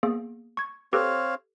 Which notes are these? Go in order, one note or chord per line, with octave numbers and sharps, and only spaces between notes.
A#3 B3 G#4
C#6 G#6
C4 G4 A4 B4 C#5 F5